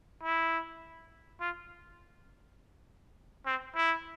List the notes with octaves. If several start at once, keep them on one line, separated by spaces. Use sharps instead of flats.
E4
F4
C4
E4